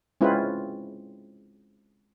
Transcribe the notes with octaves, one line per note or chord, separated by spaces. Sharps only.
G#3 C4 C#4 E4 F4 B4